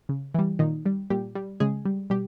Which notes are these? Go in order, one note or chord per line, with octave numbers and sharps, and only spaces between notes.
C#3
E3 G3
A#2 D#3 D#4
G3
A#2 G3 G4
G3
C#3 G#3 G#4
G3
B2 G3 G4